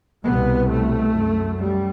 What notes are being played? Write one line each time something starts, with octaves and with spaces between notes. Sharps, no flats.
C2 B2 B3
A3
F#2
G3